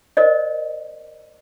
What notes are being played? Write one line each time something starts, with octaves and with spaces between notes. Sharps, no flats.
A#4 C5 D5 D#5